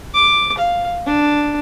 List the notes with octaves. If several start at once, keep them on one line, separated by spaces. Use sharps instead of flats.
D6
F5
D4